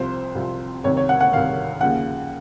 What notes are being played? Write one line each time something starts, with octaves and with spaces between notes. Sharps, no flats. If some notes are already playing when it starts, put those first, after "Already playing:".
Already playing: C2 C3 F3 C5
C2 C3 F3
C2 C3 D#3 C#5
C#5
F#5
F#5
C2 C3 D#3 F5
D#2 C#3 F3 F#5